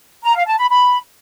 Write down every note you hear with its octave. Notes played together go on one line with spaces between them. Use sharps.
A#5
F5
A5
B5
B5